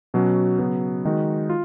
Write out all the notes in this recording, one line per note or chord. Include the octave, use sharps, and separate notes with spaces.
B2 F#3 C#4 F#4
C#3 F#3 B3
D#3 G#3 D#4 F#4
F4